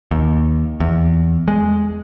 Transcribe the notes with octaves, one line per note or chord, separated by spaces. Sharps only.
D#2
E2
G#3